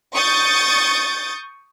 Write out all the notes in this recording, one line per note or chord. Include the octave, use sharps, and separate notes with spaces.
C#6 D#6 G6 A6